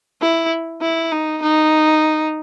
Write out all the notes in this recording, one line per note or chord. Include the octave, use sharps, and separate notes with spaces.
E4
E4
D#4
D#4